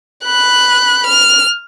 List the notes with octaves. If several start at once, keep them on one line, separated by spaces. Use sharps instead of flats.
B5 F#6
F6